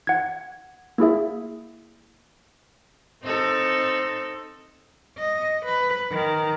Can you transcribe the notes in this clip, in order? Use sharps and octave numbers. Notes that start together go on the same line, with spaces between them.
F#5 G#6
A#3 E4 G#4 E5
C4 D#4 A4
D#5
B4
D#3